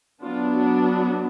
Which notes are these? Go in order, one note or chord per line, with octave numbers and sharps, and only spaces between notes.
F#3 B3 D4 F4
F#4
F#4